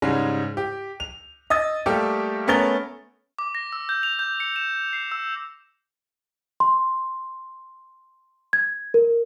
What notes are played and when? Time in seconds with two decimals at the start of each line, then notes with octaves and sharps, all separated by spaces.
0.02 G#2 C#3 G3 G#3
0.57 G4
1.00 F7
1.50 D#5 D#6 E6 A6
1.86 G3 A3 A#3 G4 A4
2.47 A3 B3 C#4 A#4 A6 G7
3.39 D6
3.55 A#6
3.72 E6
3.89 G6
4.03 F7
4.19 G6
4.40 C#7
4.56 E7
4.93 C7
5.12 E6
6.60 C6
8.53 G#6
8.94 A#4